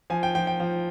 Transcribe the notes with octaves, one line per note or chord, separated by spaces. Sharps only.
F3 G#5
G5
F3 G5
G5
F3